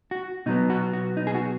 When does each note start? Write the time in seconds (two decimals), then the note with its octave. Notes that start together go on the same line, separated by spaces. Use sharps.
0.11 F#4
0.46 B2 F#3 B3 D#4
0.70 F#4
0.93 F#4
1.17 D#4
1.27 G#4
1.35 F#4